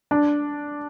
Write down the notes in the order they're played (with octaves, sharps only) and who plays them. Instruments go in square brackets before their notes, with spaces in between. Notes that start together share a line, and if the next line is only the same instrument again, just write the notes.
[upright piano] D4